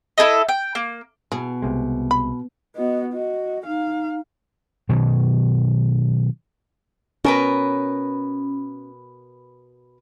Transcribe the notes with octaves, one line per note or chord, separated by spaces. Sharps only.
E4 G#4 A4 D#5
G5
A#3
B2 E3 G#4
C2 C3 G#3
B5
B3 F#4 D#5
F#4 D#5
D#4 F5
B2 D#3 F#3
B2 C#4 A#4 B4